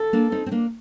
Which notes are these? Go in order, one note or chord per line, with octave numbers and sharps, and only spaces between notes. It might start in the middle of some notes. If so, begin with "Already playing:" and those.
Already playing: A4
A#3 D4
C4 D#4
C4
A#3 D4